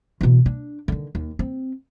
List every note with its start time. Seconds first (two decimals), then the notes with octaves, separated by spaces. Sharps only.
0.21 B2 E3
0.46 D4
0.88 D3 D#3
1.15 D#2
1.39 C4